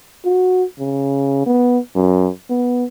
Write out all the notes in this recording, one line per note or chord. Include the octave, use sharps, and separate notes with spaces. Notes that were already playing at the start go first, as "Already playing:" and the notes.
F#4
C#3
B3
F#2
B3